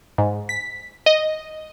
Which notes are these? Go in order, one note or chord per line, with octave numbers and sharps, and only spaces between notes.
G#2
B6
D#5